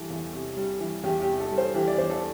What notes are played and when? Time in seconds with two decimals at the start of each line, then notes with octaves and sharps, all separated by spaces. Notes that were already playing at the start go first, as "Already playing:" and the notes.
Already playing: E3 G3 A4
0.10 E2
0.34 C3
0.57 G3
0.80 E3
1.03 E2 G4
1.22 G4
1.28 C3
1.40 A4
1.51 G3
1.58 C5
1.74 E3 G4
1.88 D5
1.98 E2 C5
2.10 A4